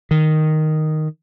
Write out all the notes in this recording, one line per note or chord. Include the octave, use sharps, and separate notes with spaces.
D#3